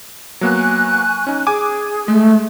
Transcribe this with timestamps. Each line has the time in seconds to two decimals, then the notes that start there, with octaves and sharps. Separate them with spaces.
0.41 F#3 A#3 B3 G#5 C#6 F#6
1.27 C#4 D#4
1.47 G#4 G#5 D6
2.08 G#3 A3